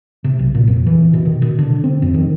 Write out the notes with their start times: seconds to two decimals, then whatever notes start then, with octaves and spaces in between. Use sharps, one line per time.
0.24 C3
0.39 B1
0.55 A#2
0.68 F2
0.87 E3
1.13 B2
1.25 D#3
1.42 B2
1.59 D3
1.84 C4
2.02 F2
2.14 D#3